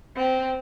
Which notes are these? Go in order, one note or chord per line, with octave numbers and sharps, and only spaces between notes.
C4